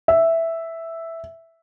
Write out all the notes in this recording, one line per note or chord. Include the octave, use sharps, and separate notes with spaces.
E5